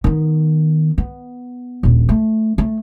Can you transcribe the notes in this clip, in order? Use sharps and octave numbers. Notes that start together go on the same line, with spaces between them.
D#3 B3
B3
D#1 A#1
A3
A3